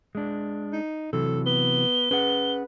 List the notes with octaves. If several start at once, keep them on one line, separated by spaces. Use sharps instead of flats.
G#3 D4
D#4
C3 E3 F#3 A4
B3 G7
C#4 G#4 B4 F#5